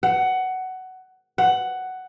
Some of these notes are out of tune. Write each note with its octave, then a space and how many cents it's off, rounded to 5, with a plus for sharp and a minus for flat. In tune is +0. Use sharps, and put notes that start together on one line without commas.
F#5 +15
F#5 +10